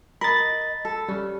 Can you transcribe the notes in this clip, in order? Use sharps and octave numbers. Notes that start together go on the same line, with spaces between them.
A#4 D#5 B5 A6
A4
G3 C#4